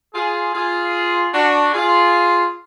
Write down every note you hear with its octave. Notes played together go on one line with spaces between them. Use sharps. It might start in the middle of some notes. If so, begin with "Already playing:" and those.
F4 G#4
F4 G#4
D4 F#4
F4 G#4